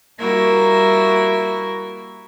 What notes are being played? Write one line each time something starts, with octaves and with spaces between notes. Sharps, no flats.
G3 A#3 E4 F#4 A#4 E5